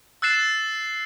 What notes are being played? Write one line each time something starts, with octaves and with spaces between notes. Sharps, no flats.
E6 F#6 A6 C7 E7